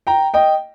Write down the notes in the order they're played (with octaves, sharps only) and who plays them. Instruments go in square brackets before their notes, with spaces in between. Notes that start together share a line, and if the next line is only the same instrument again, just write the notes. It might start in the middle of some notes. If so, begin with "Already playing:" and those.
[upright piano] G5 A#5
D#5 G5